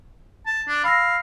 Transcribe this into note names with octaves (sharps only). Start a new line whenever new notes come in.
A5
D4
F5 B5 E6 A#6